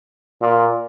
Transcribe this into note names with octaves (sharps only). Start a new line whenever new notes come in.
A#2